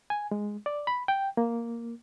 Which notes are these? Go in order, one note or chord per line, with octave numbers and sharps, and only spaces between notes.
G#5
G#3
D5
B5
G5
A#3